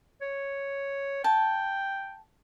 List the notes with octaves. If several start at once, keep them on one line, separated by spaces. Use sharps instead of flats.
C#5
G5 A5